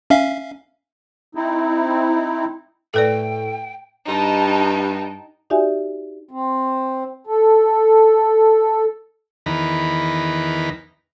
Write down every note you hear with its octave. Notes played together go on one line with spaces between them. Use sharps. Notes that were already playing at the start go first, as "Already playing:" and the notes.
C#4 E5 F5
C4 D#4 E4
A2 A4 B4 D5 G5
G2 D#4 G5 A5
D#4 F#4 G4 D5 E5 G#5
C4
A4
E2 D#3 B4 A#5